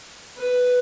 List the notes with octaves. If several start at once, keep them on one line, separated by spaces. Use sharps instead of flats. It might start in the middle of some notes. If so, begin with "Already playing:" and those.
B4